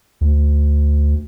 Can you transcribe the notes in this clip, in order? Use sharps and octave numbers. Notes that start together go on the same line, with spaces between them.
D2